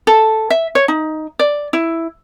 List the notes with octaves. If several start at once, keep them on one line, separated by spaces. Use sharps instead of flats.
A4
E5
C#5
D#4
D5
E4